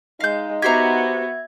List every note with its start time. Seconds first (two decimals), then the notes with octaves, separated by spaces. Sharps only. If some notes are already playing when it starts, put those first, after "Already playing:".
0.21 G#3 D#4 F5 G6
0.62 B3 F#4 G4 C5 E5 A#5 G#6